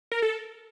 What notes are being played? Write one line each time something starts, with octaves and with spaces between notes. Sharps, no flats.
A#4
A4